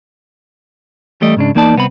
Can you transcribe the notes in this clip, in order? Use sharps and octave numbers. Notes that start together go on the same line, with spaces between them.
E3 G3 A3 D5 D#5
G#2 C#3 D4
E2 A#3 D#4 D5 A5
C2 B3 C4 B5